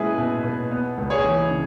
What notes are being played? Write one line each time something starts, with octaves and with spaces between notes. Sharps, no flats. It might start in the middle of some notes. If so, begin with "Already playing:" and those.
Already playing: B2 G#3 C#4 E4 G#4 B4
B2
B2
B3
C#2
G#4 C#5
E3
C#3